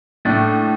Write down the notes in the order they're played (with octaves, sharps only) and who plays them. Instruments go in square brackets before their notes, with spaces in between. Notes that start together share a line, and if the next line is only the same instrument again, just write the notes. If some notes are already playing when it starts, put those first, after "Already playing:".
[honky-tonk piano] A2 [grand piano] A3 D4